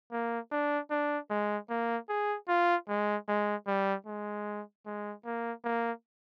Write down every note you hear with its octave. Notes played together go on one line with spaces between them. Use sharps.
A#3
D4
D4
G#3
A#3
G#4
F4
G#3
G#3
G3
G#3
G#3
A#3
A#3